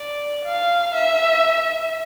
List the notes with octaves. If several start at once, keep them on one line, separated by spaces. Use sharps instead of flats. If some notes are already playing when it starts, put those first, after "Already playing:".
Already playing: D5
F5
E5